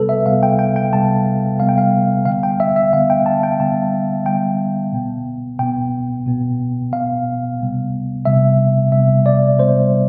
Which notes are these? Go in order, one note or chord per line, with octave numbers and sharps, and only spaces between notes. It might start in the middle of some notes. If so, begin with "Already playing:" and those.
Already playing: C3 G3 B3 A4 B4
E5
C3 G3 B3 F5
G5
G5
G5
C3 G3 B3 A5
C3 G3 B3 F5
G5
F5
D3 G3 B3 F5
G5
E5
E5
D3 G3 B3 F5
G5
A5
G5
D3 G3 B3 A5
D3 G3 B3 G5
B2 B3
B2 B3 G5
B2 B3
B2 B3 F5
C3 G3 B3
C3 G3 B3 E5
C3 G3 B3 E5
D5
C3 G3 B3 C5